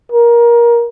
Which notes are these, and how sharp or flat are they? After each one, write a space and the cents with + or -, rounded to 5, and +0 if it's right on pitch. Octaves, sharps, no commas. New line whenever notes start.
A#4 +20